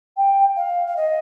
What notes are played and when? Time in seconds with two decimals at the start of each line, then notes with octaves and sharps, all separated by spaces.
0.17 G5
0.56 F5
0.87 F5
0.96 D#5